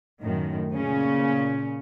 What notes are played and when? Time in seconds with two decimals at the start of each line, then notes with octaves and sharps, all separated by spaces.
0.20 F#2 A2 D#3
0.71 A#2 C#3 C#4